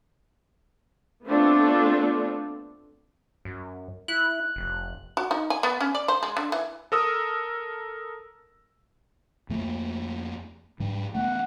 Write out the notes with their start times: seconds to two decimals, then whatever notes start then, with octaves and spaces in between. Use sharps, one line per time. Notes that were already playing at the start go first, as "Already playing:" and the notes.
1.25 A3 B3 C4 D4 F4 A4
3.45 F#2
4.08 E4 F#6
4.56 F1
5.17 F#4
5.31 D#4
5.50 G#5
5.63 B3
5.81 C#4
5.95 D5
6.08 C5
6.23 G#3
6.37 D3
6.52 E3
6.92 A4 A#4 D#6 E6
9.49 F2 A3 A#3
10.80 G#2 G3
11.15 A3 B3 F#5